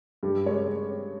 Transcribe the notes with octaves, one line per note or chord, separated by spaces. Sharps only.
G2 G4
G#3 C#5